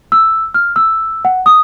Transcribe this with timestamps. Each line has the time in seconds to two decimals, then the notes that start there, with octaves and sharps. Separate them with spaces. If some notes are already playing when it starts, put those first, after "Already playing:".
0.12 E6
0.54 F6
0.76 E6
1.25 F#5
1.46 D#6